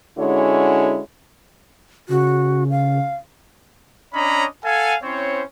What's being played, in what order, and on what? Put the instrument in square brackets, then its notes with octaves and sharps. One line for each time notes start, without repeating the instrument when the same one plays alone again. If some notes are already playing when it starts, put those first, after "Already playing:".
[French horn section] D3 G#3 C#4 E4 F#4 C#5
[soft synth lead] C#3 [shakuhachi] F#4
[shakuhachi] F5
[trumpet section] C#4 D4 C#5 D#5 A#5 B5
A4 F5 F#5 G#5
C4 C#4 E4 C5 C#5